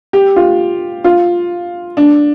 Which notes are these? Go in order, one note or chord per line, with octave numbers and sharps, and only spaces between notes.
G4
F4
F4
D4